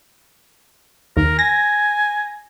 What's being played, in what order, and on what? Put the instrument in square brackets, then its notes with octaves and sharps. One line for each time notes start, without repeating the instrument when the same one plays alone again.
[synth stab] D#2 [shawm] A#4
[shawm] G#5 [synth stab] A#6